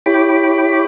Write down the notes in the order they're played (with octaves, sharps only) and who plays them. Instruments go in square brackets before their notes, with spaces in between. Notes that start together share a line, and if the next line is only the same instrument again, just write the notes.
[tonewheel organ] E4 G4 C#5 G5 B5 D6